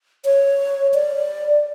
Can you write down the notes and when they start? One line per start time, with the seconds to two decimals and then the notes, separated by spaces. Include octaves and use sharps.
0.25 C#5
0.94 D5